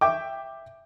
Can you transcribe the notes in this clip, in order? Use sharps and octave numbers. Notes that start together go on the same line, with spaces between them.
E5 G5 D6